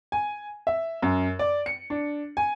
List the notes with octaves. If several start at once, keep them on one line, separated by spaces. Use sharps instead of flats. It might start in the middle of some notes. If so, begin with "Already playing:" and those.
G#5
E5
F#2
D5
C#7
D4
G#5